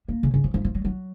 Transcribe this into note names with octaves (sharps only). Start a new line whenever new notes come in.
A#3
C#3
C#3
F3
F3
F3
F#3
F#3